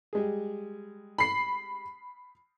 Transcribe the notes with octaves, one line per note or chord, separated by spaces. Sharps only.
G3 G#3 G#4
B5 C7